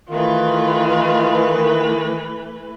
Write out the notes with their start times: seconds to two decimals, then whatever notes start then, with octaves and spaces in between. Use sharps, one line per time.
0.11 D#3 E3 A3 F4 B4